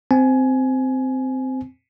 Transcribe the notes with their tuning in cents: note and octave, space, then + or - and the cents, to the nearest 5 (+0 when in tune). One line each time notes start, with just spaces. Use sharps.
C4 -10 G#5 +20